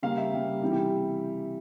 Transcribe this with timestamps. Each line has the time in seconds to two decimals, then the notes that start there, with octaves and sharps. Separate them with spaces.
0.03 C#3 G3 A#3 F5
0.17 E5
0.32 C#3 G3 A#3
0.62 C3 E3 G3
0.72 G4